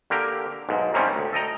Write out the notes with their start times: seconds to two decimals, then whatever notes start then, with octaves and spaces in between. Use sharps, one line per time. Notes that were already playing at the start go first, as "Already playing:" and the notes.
0.10 D3 A#3 G4 A#4
0.69 B1 G#2
0.94 G#2 C3 D#3 G3 C4 C#4
1.16 D2
1.33 A4 D#5 G5 A#5